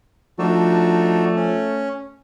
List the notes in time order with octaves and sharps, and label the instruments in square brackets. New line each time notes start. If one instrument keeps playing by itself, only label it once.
[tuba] F3 [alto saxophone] A3 [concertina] D4 D#4 F#4
[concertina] C#4